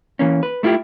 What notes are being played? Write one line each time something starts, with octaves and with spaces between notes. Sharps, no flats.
E3 A#3 C#4
B4
A3 E4 F4 G4